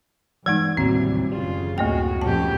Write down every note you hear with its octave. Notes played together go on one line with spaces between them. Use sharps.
G2 E3 G#3 B3 D#4 G#6
A1 D#2 C3 E3 F#3 G3 C4
F#1 C#3 G3 F4
D2 A2 A#3 F#4 G5
F2 A#2 B3 C#4 G4 A5